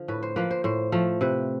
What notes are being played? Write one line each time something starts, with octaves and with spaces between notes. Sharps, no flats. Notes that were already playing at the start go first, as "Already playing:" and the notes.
Already playing: D3 F3
A2 B4
C5
F3 A#3 B4
C5
A2 C5
F3 A3
C3 B4